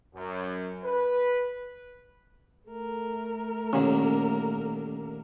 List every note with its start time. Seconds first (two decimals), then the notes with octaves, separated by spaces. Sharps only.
0.16 F#2
0.84 B4
2.69 A3 A#4
3.73 D#2 A#2 D3 C#4